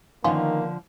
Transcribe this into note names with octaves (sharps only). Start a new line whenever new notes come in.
D3 D#3 F3 A#3 B3 C#4 F4